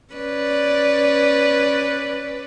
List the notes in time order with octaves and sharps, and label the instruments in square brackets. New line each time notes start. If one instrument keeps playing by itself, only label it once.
[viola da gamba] C#4 B4 D5